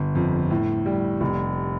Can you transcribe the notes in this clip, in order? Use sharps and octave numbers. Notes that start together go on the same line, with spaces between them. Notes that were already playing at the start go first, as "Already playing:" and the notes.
Already playing: G1
F2
A2
G3
F1